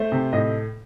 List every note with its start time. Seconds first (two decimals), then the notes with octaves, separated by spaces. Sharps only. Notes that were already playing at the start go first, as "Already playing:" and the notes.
Already playing: A3 C5
0.12 C3
0.33 A2 D#5